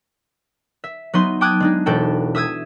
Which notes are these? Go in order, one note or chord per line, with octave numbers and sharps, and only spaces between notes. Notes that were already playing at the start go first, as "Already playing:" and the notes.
E5
F#3 B3 D#4 C6
G5 A5 D6 D#6 F#6 G#6
G#3 D4 D#4
E1 F#4 A4 G5 A5
E5 D#6 E6 G#6